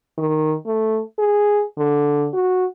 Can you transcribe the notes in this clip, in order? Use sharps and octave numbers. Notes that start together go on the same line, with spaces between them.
D#3
A3
G#4
D3
F#4